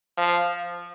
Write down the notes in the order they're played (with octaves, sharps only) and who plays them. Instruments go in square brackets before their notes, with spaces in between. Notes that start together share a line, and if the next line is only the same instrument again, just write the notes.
[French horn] F3